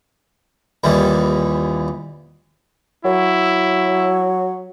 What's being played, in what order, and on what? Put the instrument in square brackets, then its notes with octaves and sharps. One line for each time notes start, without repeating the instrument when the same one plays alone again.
[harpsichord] A#1 D#2 E3 G3
[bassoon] F#3 [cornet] E4